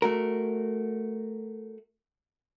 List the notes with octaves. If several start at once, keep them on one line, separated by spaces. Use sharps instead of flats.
A3 F#4 A#4